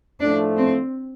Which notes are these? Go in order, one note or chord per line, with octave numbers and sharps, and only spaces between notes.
A2 F3 A3 D4
C4